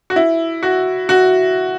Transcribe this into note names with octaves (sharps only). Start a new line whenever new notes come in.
F#4
E4
F#4
F#4